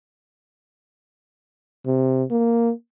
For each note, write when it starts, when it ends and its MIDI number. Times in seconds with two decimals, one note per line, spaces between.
1.86 2.24 48
2.31 2.71 58